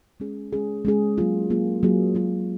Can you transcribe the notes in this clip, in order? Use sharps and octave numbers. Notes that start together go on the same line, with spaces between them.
G#3 C#4 G#4
G#3 C#4 G#4
G#3 C#4 G#4
F#3 A#3 F4 G#4
F#3 A#3 F4 G#4
F#3 A#3 F4 G#4
F#3 A#3 F4 G#4